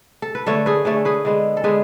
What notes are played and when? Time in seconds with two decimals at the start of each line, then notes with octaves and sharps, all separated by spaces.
0.22 A4
0.35 B4
0.47 D3 A3 A4 C#5
0.66 G#4 B4
0.85 D3 A3 A4 C#5
1.05 G#4 B4
1.25 D3 G#3 B3
1.57 A4
1.64 D3 G#3 B3 G#4 B4